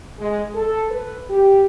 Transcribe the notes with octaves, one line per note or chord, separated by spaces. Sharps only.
G#3
A4
B4
G4